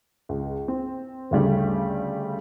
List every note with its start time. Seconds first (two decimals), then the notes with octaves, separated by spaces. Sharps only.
0.29 C#2
0.68 C4
1.31 D2 C#3 G3 A3